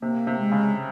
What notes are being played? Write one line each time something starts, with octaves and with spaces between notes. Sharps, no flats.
C3 A#3
C3
G#3
C#3